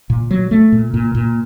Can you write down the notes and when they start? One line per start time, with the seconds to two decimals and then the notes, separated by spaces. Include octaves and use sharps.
0.10 A#2
0.31 F#3
0.51 A3
0.72 A#2
0.94 A#2
1.15 A#2